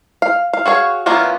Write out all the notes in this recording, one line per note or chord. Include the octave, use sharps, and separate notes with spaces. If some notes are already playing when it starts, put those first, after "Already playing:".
F5
F5
F#4 G#4 C#5 F5
E3 A#3 B3 C#4 F4